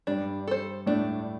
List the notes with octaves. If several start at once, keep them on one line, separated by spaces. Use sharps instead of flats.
G2 G3 D4
A4 C5
A2 A3 D4